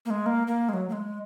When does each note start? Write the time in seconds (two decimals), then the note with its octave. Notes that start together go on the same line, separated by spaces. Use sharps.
0.05 A#3
0.10 G#3
0.26 A#3
0.47 A#3
0.69 G#3
0.73 F#3
0.89 A#3
0.93 G#3